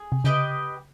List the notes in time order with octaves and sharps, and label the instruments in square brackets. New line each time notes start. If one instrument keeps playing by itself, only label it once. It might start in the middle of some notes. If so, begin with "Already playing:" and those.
Already playing: [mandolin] G#4
[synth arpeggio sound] C3
[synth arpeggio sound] C#3 [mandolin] G4 B4 D#5 G5